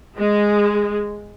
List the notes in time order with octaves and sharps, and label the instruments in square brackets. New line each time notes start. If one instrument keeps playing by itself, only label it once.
[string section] G#3